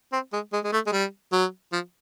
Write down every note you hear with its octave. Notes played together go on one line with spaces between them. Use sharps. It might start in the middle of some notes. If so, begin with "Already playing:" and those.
C4
G#3
G#3
G#3
A3
G#3
G3
F#3
F3